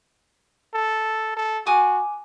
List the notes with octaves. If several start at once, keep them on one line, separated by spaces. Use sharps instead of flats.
A4
A4
F#4 G#5 D6 D#6